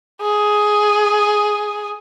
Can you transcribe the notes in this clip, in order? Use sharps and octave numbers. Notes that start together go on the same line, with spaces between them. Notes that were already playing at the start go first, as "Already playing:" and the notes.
G#4